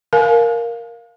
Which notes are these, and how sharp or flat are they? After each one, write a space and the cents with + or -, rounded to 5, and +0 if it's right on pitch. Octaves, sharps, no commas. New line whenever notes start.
A#4 +0 F5 +0 G#5 +40